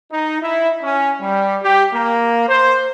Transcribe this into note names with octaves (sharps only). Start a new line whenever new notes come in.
D#4
E4
C#4
G3
G4
A#3
C5